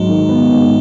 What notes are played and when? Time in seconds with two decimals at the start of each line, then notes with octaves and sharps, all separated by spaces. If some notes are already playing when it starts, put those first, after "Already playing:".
Already playing: G#2 F#3 G#3
0.09 D#3
0.29 B3
0.50 G#2